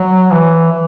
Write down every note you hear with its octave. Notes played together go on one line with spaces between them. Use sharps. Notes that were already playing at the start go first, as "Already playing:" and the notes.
Already playing: F#3
E3
E3